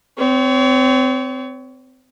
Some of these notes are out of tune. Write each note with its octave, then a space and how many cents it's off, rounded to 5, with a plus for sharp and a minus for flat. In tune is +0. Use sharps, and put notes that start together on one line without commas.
C4 -25 C#5 +25